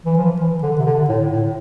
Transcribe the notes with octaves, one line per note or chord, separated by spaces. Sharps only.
E3
F3
E3
D3
C3
D3
A2
A2